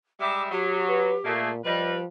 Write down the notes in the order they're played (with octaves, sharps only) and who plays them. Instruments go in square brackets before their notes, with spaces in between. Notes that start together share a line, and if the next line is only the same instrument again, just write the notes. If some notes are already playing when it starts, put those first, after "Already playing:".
[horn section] G3 G#3 E5 [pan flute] D6
[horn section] F#3 [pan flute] G4
[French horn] B4
[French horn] A#2 [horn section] A3 A#3 G#4
[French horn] F3 [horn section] G3 B4 [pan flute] D#5